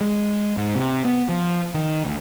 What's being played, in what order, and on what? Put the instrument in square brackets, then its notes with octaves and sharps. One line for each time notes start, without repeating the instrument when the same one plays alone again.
[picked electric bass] G#3
G#2
C3
B3
F3
D#3
D2